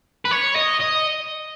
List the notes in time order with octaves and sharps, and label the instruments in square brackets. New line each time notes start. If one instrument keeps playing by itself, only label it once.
[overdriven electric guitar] B4
C#5
D#5
D#5